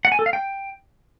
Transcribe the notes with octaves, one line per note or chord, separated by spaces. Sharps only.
F#5
G#5
A4
F5
G5